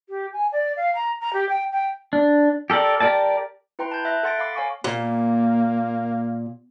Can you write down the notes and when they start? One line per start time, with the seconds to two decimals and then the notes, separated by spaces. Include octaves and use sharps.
0.09 G4
0.33 G#5
0.52 D5
0.76 F5
0.95 A#5
1.20 A#5
1.33 G4
1.49 G5
1.72 G5
2.13 D4
2.70 G4 A4 A#4 D5
3.00 G4 A#4 D5 A5
3.79 E4 B4 G5 A#5 C6
3.91 A5 G6
4.05 E5 F#6 A#6
4.23 A4 F#5 C6 A6 A#6 D7
4.39 F5 B5 D6
4.55 C#5 F5 G#5 C#6 D6
4.84 A#2 A#3